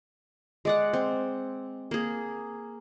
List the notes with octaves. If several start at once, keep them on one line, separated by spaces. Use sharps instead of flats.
G#3 D5 F#5
C4
A#3 G#4